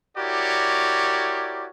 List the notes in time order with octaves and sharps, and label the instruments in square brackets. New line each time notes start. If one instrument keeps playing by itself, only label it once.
[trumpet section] E4 F#4 G4 A#4 C#5 D5